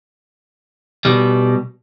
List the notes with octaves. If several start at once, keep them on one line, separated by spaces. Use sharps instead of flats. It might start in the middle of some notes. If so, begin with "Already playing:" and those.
B2 G3